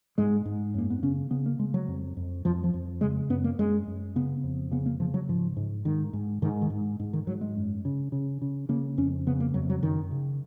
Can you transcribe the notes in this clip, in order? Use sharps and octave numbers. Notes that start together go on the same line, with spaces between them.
G#2 G#3
G#2
F#2 A#3
B3
C#3 C#4
C#3 B3
A#3
C#3 G#3
F#3
F2
F2
F2 F3
F3
F2
C#3 G#3
F#2 B3
A#3
F#2 G#3
F#2
C#3 B3
F2
C#3 B3
A#3
C#3 F3
F#3
G#2 F3
G#2
G#2 D#3
G#2
G#2 D#3
D#3
G#2
G#2
D#3
G#2 F#3
G#3
F#2
C#3
C#3
C#3
C#3 A#3
F2 C#4
C#3 B3
A#3
F2 F#3
F#3
F#2 D#3
C#3